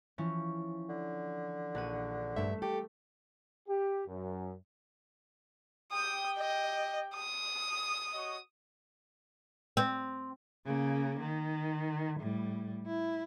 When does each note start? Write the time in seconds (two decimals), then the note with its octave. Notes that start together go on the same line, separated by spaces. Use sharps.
0.18 E3 F3 C#4
0.89 D3
1.75 A#1 F#5 D#7
2.36 G2 A3 E5
2.62 G4 A4
3.69 G4
4.07 F#2
5.92 G4 G5 D#6
6.39 D#5
7.15 D#6
8.13 F#4 C#5 D#5
9.77 C4
10.66 C#3 A#3
11.20 D#3
12.20 A2 G3
12.86 E4